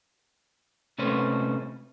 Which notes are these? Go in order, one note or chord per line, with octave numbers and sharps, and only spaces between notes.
C3 A3 C#4 B4 C5